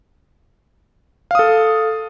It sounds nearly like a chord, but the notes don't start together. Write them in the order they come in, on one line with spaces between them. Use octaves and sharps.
F5 D#6 A4